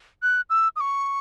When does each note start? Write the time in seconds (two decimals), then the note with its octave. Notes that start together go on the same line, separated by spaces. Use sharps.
0.23 F#6
0.50 E6
0.76 D#6
0.80 C#6